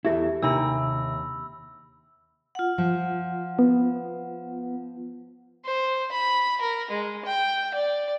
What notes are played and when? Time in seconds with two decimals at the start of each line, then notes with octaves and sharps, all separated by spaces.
0.05 E2 A3 E4 G4 G#4 E5
0.42 D#2 C3 D4 D#4 A#4 A#5 B5 E6
2.55 F4 F#5
2.78 F3
3.59 B3
5.65 C5
6.12 B5
6.61 A#4
6.91 G#3
7.25 G5
7.75 D5